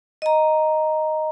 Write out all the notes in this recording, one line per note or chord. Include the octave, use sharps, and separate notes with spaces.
D#5 A#5